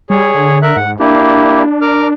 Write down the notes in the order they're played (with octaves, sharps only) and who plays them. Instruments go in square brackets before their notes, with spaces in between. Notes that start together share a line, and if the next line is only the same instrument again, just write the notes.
[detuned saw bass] G3 [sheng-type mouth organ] G#4 C#5
[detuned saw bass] D3
[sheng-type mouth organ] A#4 E5 F#6
[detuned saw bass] G#2 [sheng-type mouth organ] F#5
[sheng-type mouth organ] A#3 E4 G4 [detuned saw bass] D4
[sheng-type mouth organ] A#4 D6 F6